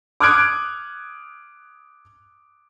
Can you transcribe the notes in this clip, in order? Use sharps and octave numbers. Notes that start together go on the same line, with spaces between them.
D6 D#6 F6 F#6 G#6 D7